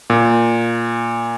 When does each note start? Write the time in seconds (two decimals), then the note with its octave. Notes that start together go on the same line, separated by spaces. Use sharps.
0.10 A#2